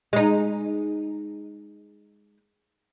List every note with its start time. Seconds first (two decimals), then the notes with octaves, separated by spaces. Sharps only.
0.13 G#3 D#4